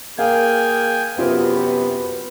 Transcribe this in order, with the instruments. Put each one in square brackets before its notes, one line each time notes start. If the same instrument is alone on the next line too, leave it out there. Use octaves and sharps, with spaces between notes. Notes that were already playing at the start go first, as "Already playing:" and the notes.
[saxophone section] A#3 G#4 [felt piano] F5 [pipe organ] G5 G#5
[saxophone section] F#2 C3 [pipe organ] B3 [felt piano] F4 [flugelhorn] B4